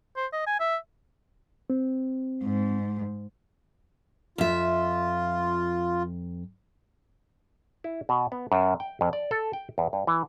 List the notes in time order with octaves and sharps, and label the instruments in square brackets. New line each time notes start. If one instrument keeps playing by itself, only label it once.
[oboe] C5
D#5
G#5
E5
[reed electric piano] C4
[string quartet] G#2
[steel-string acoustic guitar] F2 E5 [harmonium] F4
[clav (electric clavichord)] E4
B2
B3
F#2
G5
F2
D5
A4
G5
E2
G2
E3